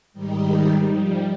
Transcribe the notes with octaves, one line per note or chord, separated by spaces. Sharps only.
G#2 D#3 G3 D#4
F3 G3